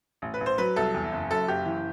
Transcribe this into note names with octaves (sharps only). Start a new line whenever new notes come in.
A1
B4
A1
C5
F#3 B4
C2 A4
E2
F#1
F#2 A4
F#1 G4
E3